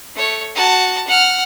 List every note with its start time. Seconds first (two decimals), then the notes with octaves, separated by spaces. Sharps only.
0.16 A3 C#5
0.55 F#4 A5
1.07 F#5 F6